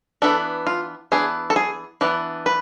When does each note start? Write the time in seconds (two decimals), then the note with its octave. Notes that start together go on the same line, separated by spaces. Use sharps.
0.22 E3 B3 D4 A4
0.67 F4
1.12 E3 B3 D4 G#4
1.50 A4
1.56 G#4
2.01 E3 B3 D4
2.46 B4